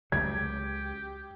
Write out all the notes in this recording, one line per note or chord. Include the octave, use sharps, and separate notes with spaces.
C#2 C#3 F#3 G4 G#6